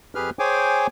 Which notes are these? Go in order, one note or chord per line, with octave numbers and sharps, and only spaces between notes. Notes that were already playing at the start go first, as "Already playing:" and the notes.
F2 G4 G#4 B4 F6
G#4 C5 C#5 G5 G#5 D6